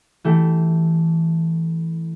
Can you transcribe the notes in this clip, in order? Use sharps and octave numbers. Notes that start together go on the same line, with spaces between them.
E3 A3 G4